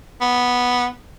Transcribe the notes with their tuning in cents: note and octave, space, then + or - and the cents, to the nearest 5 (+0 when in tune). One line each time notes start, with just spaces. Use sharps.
B3 -5